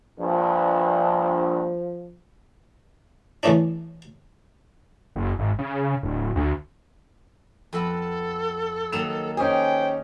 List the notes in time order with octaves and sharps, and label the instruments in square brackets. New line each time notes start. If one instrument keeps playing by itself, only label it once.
[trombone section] A#1 G2 [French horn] F3
[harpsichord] E2 C#3 E3 A3 C#4 D4
[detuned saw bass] F#1
G#1
C#3
D1
D2
[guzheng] F2 B3 [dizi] A4
[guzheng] D#3 F#3 A#3 [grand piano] E7 F7
[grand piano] C#4 D#4 G4 [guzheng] G#4 [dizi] C5 [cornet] G5